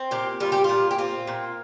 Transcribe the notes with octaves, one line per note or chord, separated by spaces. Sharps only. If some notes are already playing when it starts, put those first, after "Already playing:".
Already playing: C4
A#2 G4
G3 F4
G4
A#2 F4
G4
C4 F4
A#2